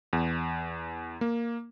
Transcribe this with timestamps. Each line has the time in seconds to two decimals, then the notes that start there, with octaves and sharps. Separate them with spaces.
0.13 E2
1.21 A#3